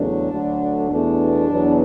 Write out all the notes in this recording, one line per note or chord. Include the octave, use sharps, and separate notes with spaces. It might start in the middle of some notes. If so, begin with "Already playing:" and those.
Already playing: E2 C#3 F#3 A3 D4
D2 D3 F#3 A3
E2 B2 A3 D4
E2 B2 F#3